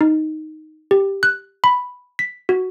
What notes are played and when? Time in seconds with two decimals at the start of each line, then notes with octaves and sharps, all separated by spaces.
0.01 D#4
0.91 G4
1.23 F#6
1.64 B5
2.19 B6
2.49 F#4